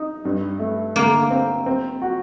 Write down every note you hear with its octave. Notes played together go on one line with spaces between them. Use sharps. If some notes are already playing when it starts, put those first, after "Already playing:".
Already playing: D#4
G2
A3
D3 A#3
C4
C4
F#4